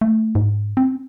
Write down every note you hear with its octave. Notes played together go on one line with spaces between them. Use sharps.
A3
G#2
C4